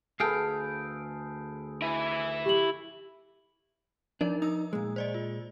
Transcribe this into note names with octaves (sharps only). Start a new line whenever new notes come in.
D2 G#4 A4 B4 F5 G5
E4 G#5
G4 F#7
F3 D4 D#4 A#4 D5
D#4 D#6 E6
A#2 G#3
C5 D5 D#5
F4